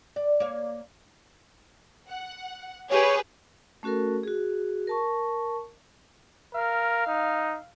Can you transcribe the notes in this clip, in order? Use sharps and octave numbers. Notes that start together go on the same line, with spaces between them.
D5
A#3 C#5 F5
F#5
G4 G#4 B4 C#5
A3 C#4 F#4 A4 A#4
F#4 G#4
A#4 A5 C#6
A#4 F5
D#4